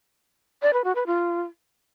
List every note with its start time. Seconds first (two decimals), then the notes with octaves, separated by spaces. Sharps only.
0.62 D5
0.73 B4
0.84 F#4
0.95 B4
1.06 F4